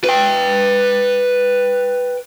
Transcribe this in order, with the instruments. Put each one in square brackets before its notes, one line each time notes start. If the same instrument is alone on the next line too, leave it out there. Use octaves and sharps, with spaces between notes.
[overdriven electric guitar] B4 G5